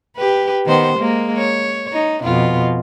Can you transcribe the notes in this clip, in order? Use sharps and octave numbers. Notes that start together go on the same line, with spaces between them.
G4 B4
D#3 B3 C5
G#3 A#3
C#5
D#4
F2 B2 F4